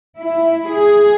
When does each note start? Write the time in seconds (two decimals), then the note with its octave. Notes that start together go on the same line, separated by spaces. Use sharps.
0.21 E4
0.70 G#4